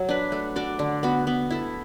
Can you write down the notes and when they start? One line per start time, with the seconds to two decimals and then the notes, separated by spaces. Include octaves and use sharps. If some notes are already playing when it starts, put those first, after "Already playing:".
Already playing: F#3
0.09 D4 B4
0.32 A3
0.56 D4 F#4 D5
0.79 D3
1.03 B3 F#4
1.27 B3
1.50 E4 A4